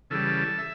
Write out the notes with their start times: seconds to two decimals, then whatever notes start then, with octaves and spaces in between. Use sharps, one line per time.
0.10 C#3 E3 G3 A4
0.58 E5